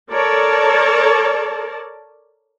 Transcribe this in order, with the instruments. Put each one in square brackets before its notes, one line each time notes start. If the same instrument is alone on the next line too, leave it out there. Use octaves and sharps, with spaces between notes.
[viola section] A4 A#4 C#5 D5 A5